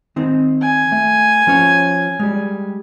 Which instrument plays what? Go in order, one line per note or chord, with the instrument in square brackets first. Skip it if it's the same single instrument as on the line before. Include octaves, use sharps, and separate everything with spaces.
[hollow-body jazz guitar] D#3 C4 D#4
[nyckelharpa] G#5
[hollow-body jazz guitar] A3 E5
F3 C#4 C#5
G3 G#3